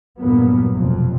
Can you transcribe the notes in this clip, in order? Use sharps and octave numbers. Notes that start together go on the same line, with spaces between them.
E2 G2 A#2 F#3 A#3 B3
F1 B1 F2